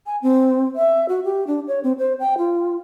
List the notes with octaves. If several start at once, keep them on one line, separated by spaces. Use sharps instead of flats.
G#5
C4
E5
F#4
G4
D4
C#5
C4
C5
G5
F4